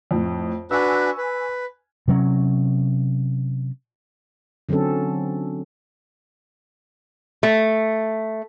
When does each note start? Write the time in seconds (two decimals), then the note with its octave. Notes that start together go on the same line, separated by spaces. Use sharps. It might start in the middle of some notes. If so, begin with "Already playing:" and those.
0.11 F2 A2
0.71 D4 F#4 B4 G#5 C#6 E6
1.17 B4
2.08 C3 F#3 C4 C#4
4.69 D3 F#3 C4 C#4 A4
7.43 A3